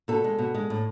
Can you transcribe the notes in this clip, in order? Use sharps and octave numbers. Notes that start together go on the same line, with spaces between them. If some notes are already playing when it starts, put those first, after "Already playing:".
B2 A4
G#3
B2
G#3
A2